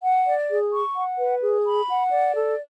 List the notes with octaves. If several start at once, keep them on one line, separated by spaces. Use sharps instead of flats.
F#5
D5
G#4
C#6
F#5
B4
G#4
B5
F#5
D5
A4